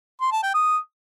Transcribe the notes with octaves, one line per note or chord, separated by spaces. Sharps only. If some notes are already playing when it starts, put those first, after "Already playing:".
C6
A5
G5
D#6